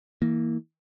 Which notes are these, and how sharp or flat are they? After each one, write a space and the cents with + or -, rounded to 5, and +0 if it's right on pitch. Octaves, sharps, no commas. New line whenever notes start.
E3 -20 A#3 +0